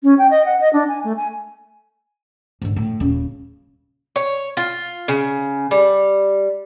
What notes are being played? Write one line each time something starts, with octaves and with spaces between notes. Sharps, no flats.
C#4
G5
D#5
F#5
D#5
D4
G#5
A3
G#5
G#2 D3
A2
D#1 C#3
C#5
F4
C#3
G3